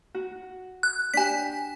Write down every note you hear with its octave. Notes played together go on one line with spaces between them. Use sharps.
F#4
F#6
D4 G4 G#5 B6